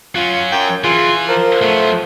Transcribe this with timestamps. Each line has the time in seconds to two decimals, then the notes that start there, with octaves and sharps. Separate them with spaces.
0.15 F#3 C#4 F4
0.52 F#2 G5
0.84 E3 F4 G#4
1.28 F3 A#4 C5
1.62 F#3 A3 B3